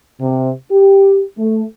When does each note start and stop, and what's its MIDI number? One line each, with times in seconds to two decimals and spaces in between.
0.21 0.51 48
0.71 1.22 67
1.38 1.63 57